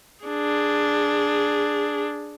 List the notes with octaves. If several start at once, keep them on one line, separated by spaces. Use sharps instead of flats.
D4 G#4